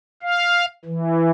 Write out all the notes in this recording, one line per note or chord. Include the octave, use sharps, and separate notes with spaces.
F5
E3